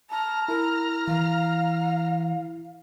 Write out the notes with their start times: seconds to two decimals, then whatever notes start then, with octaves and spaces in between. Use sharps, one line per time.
0.10 A5 A#5 F6
0.48 E4 A#4
1.08 E3 F5